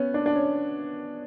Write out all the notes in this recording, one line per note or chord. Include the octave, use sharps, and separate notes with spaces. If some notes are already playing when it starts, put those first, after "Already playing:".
Already playing: B3 C#4
D4
D4
C#4